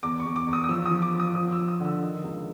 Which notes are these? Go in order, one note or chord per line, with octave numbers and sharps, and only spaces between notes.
E2 D6
C#6
E2
D6
E2
D#6
D#6
F3 E6
D#6
F3
D6
F3
D#6
F3 D#6
E6
F3
D#6
D3 E6
D#3
C#2